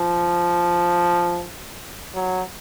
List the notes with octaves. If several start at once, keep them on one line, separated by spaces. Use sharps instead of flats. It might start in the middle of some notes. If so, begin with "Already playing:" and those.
Already playing: F3
F#3